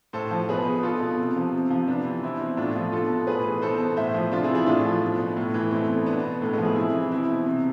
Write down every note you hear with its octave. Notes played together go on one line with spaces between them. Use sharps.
A2 A4 C5
F3
B2 G#4 B4
B2
B2 F4 A4
B2
C3
F3
C3
F3
C3 B3 D4
E3
B2 C4 E4
B2
A2 D4 F4
F3
B2 F4 A4
B2
A2 G#4 B4
E3
B2 A4 C5
B2
A2 C5 E5
F3
C3 D4 F4
E4 G#4
E3
E4 G#4
A2 D4 F4
F3
B2
B2
A2
E3
B2 A3 C4
B2
B2 B3 D4
B2
A2 A3
G#3 B3
F3
E4 G#4
C3 E4 G#4
E3
B2 C4 E4
B2
C3